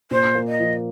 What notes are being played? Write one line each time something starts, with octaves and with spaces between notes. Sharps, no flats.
A#2 C5
A#3
D#5
F3